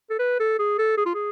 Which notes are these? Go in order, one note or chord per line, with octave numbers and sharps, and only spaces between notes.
A4
B4
A4
G#4
A4
G#4
F4
G#4